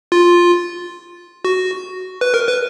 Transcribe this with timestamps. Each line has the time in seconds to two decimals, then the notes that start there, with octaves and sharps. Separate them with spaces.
0.12 F4
1.45 F#4
2.21 B4
2.34 A#4
2.49 B4